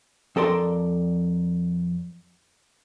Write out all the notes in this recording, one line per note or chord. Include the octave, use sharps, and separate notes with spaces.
F2 A4 A#4 D5 C6